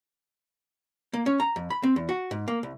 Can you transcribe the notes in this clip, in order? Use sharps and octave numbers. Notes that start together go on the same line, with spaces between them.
A#3
C#4
A#5
F2
B5
C4
E2
F#4
G#2
A#3
C2